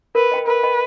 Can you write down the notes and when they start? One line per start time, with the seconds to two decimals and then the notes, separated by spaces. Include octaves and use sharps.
0.15 A#4 B4
0.32 D#5 G5 B5
0.47 A#4 B4
0.63 D#5 G5 B5